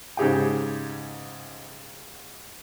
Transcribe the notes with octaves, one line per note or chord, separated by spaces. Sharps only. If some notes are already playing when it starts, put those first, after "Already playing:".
G#2 C#3 D#4 G4 G#4 G5